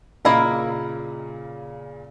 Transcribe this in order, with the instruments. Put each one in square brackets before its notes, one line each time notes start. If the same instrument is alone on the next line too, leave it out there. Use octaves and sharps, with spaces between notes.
[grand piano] A#2 C#3 [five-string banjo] A#3 E4 A#4 D#5